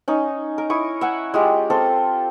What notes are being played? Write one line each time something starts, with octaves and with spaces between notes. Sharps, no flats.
C#4 D#4
A#4
E4 C#6 D#6
E5 F#5 G#5
G#3 F4 G4
C4 F4 A4